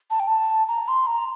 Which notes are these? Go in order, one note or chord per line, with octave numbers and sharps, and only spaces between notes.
A5
G5
A5
A#5
C6
A#5